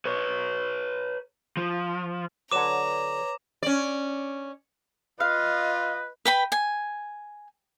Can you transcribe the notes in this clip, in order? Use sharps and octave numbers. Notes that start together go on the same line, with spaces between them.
B4 C#5
F3
D3 F#3 B4 C#5 A#5 D6 E7
C#4 D5
F4 B4 D#5 F5
B4 G5 B5
G#5